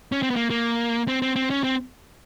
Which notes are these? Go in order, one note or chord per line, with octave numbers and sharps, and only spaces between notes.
C#4
C4
B3
A#3
A#3
C4
C4
C4
C#4
C4